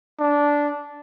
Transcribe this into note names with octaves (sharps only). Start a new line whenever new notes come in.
D4